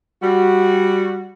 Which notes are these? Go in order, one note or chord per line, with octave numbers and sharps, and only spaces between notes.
G3 F#4